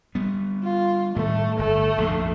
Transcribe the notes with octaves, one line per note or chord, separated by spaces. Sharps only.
G3 B3
F4
A2 D#3 G3 A3
G1 A3
A#1 F2 G#2